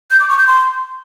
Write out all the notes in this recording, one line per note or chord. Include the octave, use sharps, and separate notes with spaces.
G6
D6
C#6
G6
C6